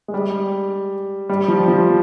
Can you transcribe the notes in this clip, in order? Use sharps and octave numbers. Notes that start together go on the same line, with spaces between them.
G#3
G3
G3
F3
F3